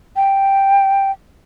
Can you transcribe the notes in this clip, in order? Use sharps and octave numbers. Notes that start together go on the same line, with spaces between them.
G5